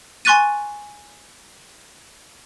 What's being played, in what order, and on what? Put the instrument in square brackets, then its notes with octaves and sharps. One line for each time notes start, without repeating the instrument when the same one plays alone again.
[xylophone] G#5 C6 C#6 F#6 A6 D#7